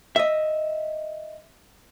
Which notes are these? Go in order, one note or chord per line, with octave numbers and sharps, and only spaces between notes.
D#5 E5